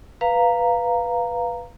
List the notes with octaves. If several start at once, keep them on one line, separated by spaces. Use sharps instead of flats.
B4 F5 A#5